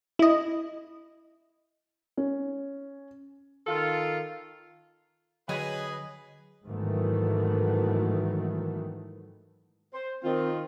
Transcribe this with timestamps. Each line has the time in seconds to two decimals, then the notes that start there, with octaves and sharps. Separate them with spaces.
0.19 E4 D#5
2.17 C#4
3.66 D#3 F4 A4
5.49 D3 F#3 G#4 B4 C#5 D#5 G#5 B5
6.67 G#2 D#3 E3 F#3 A3 B3
9.94 C5
10.24 D#3 C4 F4